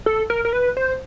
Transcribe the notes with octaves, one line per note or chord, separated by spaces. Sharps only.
A4
A#4
A#4
B4
C5